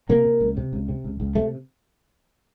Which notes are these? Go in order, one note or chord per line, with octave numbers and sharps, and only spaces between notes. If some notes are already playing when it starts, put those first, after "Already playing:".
C3 A#3
C3
C#2
C3
C#2
C3
C#2
C#2
C3 A3